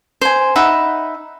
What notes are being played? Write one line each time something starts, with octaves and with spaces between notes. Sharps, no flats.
C5 G#5
D#4 E5 F#5 B5